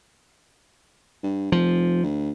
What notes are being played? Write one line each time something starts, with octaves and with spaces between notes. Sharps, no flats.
G2
F1 F3
D2